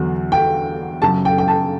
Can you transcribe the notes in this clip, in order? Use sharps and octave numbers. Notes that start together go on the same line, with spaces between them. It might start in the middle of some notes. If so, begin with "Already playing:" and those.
Already playing: E2 D3 F#3
G5
F#2 C#3 F#3 A5
G5
G5
A5